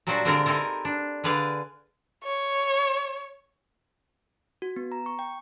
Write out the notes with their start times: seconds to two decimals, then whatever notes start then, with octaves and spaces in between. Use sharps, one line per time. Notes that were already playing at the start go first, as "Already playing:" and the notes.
0.07 A#2 F#3 G3 D4 F#4 C5
0.25 D3 G#3 C4 F4 G4 A#4
0.46 C4 D#4 E4 A4 A#4
0.85 D4
1.24 D3 G#4 B4 D5 F5
2.24 C#5
4.62 F#4
4.76 B3
4.92 A#5
5.06 C#6
5.19 G5